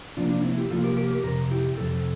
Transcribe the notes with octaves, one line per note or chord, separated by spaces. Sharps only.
C3 F3 A#3 D4 F4
D4
C4 E4
E4 G4
C3 F3 A#3 F4 A4
G4 A#4
G4 A#4
G4 A#4
F2 C3 A#4
E4 G4
F2 C3 A4